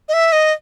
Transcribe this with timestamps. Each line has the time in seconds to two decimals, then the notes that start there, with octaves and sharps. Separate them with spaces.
0.09 D#5
0.13 E5
0.32 D#5